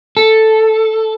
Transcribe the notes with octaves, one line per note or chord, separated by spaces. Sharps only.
A4